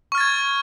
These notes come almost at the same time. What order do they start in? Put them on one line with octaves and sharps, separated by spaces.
C#6 F6 A6 G#6